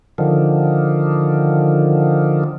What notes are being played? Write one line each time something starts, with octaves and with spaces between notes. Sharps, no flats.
D3 D#3 F3